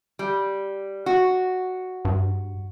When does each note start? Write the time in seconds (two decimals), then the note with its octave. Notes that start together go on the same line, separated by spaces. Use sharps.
0.19 G3
1.06 F#4
2.05 G2